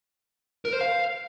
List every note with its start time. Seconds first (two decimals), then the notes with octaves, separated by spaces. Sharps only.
0.65 A#4
0.73 C5
0.81 F5